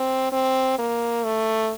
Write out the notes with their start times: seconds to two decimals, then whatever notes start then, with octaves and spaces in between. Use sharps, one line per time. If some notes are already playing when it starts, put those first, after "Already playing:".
Already playing: C4
0.32 C4
0.79 A#3
1.25 A3